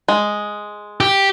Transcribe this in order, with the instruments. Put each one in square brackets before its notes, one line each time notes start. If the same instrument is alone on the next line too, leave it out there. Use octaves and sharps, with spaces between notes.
[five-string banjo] G#3
[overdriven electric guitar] G4